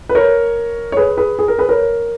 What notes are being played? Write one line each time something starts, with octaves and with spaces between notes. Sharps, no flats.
B4
A#4 C#5
C#5
G#4 B4
G#4 B4
G#4
A#4
G#4 B4
A#4 C#5